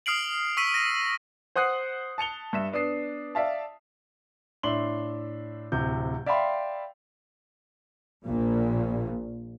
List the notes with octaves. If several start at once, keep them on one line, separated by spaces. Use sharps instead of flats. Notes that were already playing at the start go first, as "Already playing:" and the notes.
D#6 F6 C7 D7 F#7
C#6 E6 B6 D#7
A#6 D#7
C5 F#5 D#6 F#6 C7
A5 C#7 F7 G7
G2 E5 E7
B3 D4 D#6 C7
D5 E5 F5 A5
A2 D4 E5 C6 F#7 G7
D1 C3 G6
D5 E5 F5 G5 B5 C6
A#1 A#2